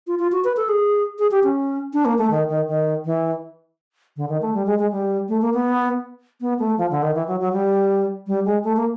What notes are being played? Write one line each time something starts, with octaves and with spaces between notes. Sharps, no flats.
F4
F4
F#4
B4
A4
G#4
G#4
G4
C#4
D4
A#3
A3
D#3
D#3
D#3
E3
D3
D#3
A3
G3
G#3
G#3
G3
A3
A#3
B3
B3
A3
F3
D3
D#3
E3
F#3
F#3
G3
G3
G#3
A3
A#3